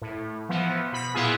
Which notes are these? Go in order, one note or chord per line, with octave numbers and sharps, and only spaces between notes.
A2
E3 F3 B3
B2 B5
A#2 B3 E4 F4 G#4